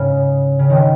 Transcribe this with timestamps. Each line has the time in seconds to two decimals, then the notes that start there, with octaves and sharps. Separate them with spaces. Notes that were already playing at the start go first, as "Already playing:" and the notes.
Already playing: G#2 C#3
0.59 C#3
0.70 D#3